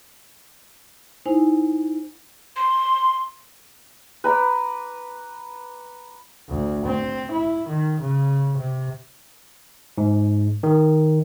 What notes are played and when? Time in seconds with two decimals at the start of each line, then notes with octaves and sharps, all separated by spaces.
1.26 D#4 E4 C5 G#5
2.56 C6
4.24 B4 A#5 B5 D6
6.49 D2
6.85 C4
7.31 E4
7.68 D#3
8.00 C#3
8.57 C3
9.98 G#2
10.63 D#3